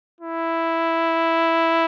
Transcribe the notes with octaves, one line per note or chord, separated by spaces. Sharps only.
E4